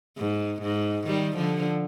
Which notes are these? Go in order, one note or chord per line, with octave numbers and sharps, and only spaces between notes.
G#2
G#2
D#3 G3
D3 F3